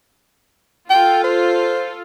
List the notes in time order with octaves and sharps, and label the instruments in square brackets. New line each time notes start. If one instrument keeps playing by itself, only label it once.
[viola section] F4 A4 [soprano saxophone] G5
[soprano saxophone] C5